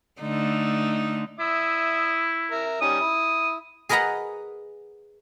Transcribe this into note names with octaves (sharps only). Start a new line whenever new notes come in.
D3 A3 D#4
E4 E5 D#6
A#4 E5
G3 C#4 D#4 D#6
E4
G#4 A#4 B4 D#5 F#5 A#5